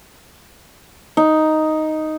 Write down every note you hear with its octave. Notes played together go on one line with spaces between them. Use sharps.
D#4